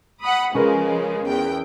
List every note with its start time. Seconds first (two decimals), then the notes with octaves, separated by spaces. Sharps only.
0.21 F#5 B5 D#6
0.54 C#3 F3 G#3 C#4 A#4 B4
1.27 E2 G5